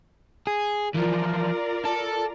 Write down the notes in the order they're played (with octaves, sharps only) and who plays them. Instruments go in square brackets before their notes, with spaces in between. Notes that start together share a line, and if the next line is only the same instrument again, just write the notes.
[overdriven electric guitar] G#4
[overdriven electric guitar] E3 F3 [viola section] F4 A#4 D5
[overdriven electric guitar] A4